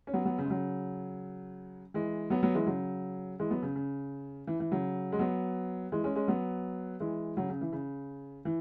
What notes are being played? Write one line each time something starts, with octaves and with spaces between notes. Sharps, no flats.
C#4
F#3 B3
F#3 B3
C#3
G#3
C#3 F#3
E3 G#3
F#3 B3
F#3 B3
E3 G#3
C#3 F#3
E3 G#3
F#3 B3
C#3
C#3
E3
E3
C#3 F#3
G#3
F#3 B3
E3 G#3
G#3 C#4
G#3 C#4
F#3 B3
E3 G#3
C#3 F#3
C#3
E3
C#3
E3